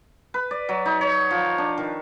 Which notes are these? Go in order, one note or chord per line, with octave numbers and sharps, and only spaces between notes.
B4
D5
F#3
D#4
C#5
F3
D4
D#3